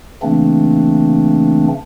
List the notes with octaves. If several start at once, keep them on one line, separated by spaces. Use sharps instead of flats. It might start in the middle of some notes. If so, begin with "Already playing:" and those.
C#3 E3 A3 A#3 C4 D4